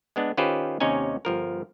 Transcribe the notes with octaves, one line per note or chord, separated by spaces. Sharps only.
G#3 B3 D4
D#3 C#4 F4 G4 B4 C5
D#2 C3 C#4 D#4 C#5 G#5
G1 F3 A#4